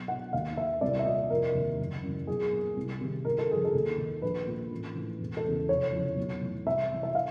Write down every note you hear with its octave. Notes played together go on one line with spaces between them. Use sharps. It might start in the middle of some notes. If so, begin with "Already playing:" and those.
Already playing: B1
B2 F#5
D#2 F5
D#3 E5
C2 D5
E5
A#2 D#5
F1 A#4
D#2 D#3
F#1
F#2 C#3 E3
B1 G#4
A#2
C2
C3 D#3
G1 A#4
A4
F2 C#3 G#4
A4
D#2
D#3
A#1 B4
A#2
A1
A2 E3
E1
A4
E2 C#3 E3
F1 C#5
F2 C#3 E3
B1
A2 E3
C2 E5
C3 E3
E5
F5